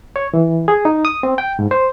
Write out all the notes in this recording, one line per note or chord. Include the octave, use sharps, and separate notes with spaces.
C#5
E3
G#4
D#4
D#6
C4
G5
G#2
C5